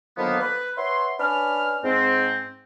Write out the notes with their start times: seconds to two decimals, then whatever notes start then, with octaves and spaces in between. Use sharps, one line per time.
0.18 D3 D#3 F3 F#3 A#3 B3
0.40 B4
0.77 B4 C#5 E5 F#5 C6
1.20 C#4 D4 B4 F6
1.84 G#2 C4